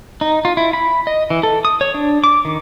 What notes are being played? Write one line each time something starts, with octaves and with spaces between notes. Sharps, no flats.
D#4
F4
E4
B5
D#5
E3
A4
D#6
C#5
D4
D6
D#3